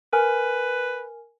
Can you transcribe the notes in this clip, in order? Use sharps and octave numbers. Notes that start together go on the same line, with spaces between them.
A#4 B4 G#5 F6